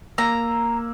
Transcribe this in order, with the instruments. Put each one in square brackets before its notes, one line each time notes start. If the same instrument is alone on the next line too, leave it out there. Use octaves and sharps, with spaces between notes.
[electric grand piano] A#3 E6 [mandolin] A#5